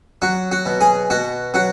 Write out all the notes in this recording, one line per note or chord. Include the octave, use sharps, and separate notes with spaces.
F#3 F#4
F#4
B2
G#4
B2 F#4
F#3 F#4